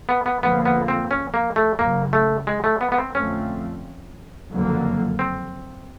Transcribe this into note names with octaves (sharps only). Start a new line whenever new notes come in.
B3
B3
F2 D3 F3 A#3 B3
B3
C4
C#4
A#3
A3
F#1 F#2 C#3 A#3
A3
G#3
A3
B3
B3
C4
F2 D3 F3 A3 C4 C#4
F#1 F2 D3 F#3 A#3
C4